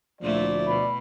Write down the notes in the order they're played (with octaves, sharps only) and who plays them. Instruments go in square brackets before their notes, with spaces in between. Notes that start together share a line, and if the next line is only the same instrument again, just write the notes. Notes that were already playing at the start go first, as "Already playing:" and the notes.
[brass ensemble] D2 F3 [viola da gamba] A#2 A3 E4 [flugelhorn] D5
[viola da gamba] B2 [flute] B5